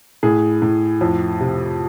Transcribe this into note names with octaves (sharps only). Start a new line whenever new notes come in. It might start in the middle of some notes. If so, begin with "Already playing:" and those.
A2 G#4
A2
F2
C3